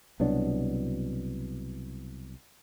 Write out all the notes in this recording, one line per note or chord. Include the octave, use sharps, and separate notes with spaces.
C2 B2 F#3 D4